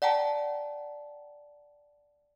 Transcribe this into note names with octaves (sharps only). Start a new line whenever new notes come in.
D5 F#5 G5 A5 A#5